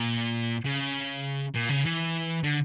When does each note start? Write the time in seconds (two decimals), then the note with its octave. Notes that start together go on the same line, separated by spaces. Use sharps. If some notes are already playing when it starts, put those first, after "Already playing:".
Already playing: A#2
0.65 C#3
1.54 A#2
1.69 C#3
1.85 E3
2.44 D3